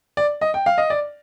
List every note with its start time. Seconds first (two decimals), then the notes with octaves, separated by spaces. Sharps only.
0.17 D5
0.41 D#5
0.54 G5
0.66 F5
0.78 D#5
0.90 D5